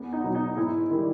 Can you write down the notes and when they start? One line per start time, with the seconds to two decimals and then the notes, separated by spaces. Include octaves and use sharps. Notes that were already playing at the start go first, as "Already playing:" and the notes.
Already playing: E2 B3
0.13 D#4
0.23 B2 F#3
0.35 D#4
0.57 G#2 E4
0.90 D#3 G3 E4